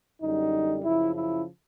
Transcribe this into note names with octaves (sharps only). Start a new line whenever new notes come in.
F#2 D3 G3 D#4
F#2 C#3 F3 E4
E4